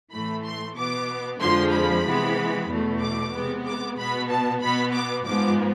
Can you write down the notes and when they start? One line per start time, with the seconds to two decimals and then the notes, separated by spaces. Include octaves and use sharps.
0.11 A2 E3 A3 B5
0.44 C6
0.77 B2 B3 D6
1.40 F2 D3 F3 G#3 C6
1.72 B5
2.05 C3 E3 G#3 B3
2.69 E2 B2 A3
3.00 D6
3.33 C3 G#3 B3
3.65 D6
3.97 B2 B3 B5
4.30 A5
4.61 B2 B3 B5
4.93 D6
5.25 G#2 F3 G#3 B3 D6